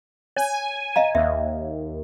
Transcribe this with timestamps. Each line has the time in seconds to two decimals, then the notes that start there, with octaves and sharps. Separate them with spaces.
0.36 C#5 G#5
0.96 D#5 F5 A#5
1.15 D#2 E5